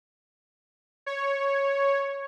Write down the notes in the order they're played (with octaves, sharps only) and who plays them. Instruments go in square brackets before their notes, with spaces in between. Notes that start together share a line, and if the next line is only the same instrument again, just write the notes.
[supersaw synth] C#5